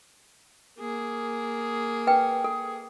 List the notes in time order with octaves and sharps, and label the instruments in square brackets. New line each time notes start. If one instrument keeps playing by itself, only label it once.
[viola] A#3 G#4
[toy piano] B4 G5
A4